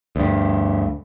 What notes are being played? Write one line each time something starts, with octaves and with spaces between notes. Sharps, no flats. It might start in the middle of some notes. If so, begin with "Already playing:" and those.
D2 G2